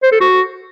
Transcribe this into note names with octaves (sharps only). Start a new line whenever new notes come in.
C5
A4
F#4